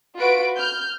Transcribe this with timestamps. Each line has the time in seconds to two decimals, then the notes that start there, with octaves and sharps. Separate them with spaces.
0.16 F4 F#4 B4 D7
0.57 F6 G6